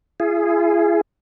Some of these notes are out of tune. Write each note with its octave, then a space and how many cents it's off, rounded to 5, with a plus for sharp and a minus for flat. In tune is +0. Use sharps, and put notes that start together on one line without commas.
E4 +45 G#4 +0